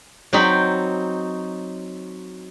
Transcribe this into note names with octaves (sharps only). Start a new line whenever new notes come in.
F#3 C4 D#4 G5 B5